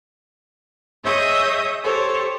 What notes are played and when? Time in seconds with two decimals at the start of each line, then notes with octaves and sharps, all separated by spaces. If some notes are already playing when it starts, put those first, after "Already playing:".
1.04 G#4 C#5 D#5 E5 D#6 G6
1.83 G4 A4 C5 C#5